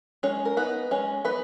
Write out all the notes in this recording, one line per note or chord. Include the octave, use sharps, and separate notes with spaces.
G#3 C#4 C#5
A#4
B3 D#4 B4
G#3 C#4 C#5
B3 D#4 B4